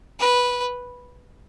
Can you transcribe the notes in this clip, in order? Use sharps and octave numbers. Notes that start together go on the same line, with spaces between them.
B4